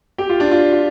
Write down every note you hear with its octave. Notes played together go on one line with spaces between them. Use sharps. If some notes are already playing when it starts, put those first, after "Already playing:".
G4
F4
D4
F4
F4